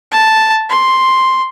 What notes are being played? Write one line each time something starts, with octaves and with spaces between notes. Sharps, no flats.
A5
C6